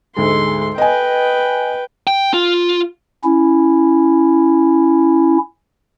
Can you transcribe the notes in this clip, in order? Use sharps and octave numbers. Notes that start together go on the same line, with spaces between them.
D2 G#2 G#3 A4 C6
B4 D#5 G5 G#5
G5
F4
C#4 E4